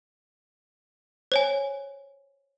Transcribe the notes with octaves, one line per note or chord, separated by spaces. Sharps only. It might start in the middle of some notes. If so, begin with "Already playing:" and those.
C5 C#5 G#5